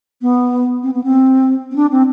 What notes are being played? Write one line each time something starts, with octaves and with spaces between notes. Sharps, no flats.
B3
C4
B3
C4
C4
D4
C4